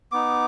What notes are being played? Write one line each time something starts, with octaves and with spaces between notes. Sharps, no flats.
B3 D#4 D6